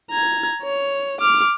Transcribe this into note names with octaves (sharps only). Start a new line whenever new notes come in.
A#5 G#6
C#5
D6 F6